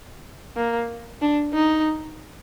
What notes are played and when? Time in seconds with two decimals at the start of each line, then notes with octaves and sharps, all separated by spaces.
0.57 A#3
1.22 D4
1.54 D#4